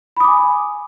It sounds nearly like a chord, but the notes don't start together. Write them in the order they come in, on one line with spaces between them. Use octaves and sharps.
B5 D#6 D6 G#5